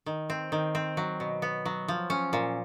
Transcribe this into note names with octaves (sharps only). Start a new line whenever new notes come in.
D#3
C4
D#3
C4
F#3
B2
B3
F#3
F3
C#4
A#2